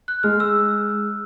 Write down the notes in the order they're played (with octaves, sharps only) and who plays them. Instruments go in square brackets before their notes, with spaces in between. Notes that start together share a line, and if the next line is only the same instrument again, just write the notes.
[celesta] F#6
[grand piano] G#3 [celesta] F6
[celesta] E6